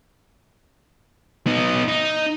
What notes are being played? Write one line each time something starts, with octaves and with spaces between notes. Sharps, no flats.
B3 D#4
D#4